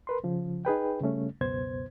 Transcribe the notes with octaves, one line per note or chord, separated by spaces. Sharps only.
A#4 B4 C6
C#3 F3
D#4 G#4 B4 G5
C#3 G3 A3 C#4
C#2 F#2 B2 B3 C5 G#6